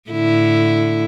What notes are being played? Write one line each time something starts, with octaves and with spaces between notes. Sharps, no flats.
A2 D3 E4